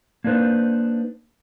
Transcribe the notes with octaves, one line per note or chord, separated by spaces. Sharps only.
A#3 D4 D#4 B4 C5